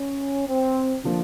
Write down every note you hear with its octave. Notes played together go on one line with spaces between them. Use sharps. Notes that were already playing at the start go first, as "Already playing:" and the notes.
Already playing: C#4
C4
D3 F3 A#3 D4